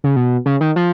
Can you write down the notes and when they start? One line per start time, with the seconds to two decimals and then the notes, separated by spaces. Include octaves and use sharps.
0.04 C#3
0.16 B2
0.46 C#3
0.61 D#3
0.76 F3